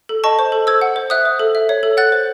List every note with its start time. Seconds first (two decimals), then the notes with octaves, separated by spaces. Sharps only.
0.09 A4
0.24 D#5 A5 C#6
0.39 C5
0.52 A4
0.67 C5 E6 G#6
0.82 F#5
0.96 C5
1.10 E5 D#6 F#6
1.25 C5
1.39 A4
1.55 E5
1.69 C#5
1.83 A4
1.97 F#5 F#6 A6
2.12 C5